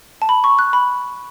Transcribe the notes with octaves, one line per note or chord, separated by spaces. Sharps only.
A5
B5
C#6
F#6
B5